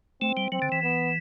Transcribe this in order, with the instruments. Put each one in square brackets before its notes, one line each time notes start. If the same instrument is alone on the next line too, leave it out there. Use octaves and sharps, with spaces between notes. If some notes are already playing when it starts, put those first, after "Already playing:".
[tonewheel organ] A3 [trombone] C4
[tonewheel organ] G3
[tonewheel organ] F#3 [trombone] C4
[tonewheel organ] D3
E3
[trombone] B3